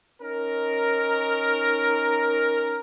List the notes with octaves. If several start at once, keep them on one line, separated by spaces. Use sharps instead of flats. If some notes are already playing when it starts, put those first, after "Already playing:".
C#4 D#4 A#4